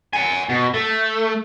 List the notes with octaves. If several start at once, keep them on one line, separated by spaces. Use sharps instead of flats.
F#5 G#5
B2
A3